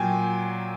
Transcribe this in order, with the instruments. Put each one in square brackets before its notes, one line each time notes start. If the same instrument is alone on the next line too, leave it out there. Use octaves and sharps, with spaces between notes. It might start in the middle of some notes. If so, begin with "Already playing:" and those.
Already playing: [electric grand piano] A#2 F#3 G5 G#5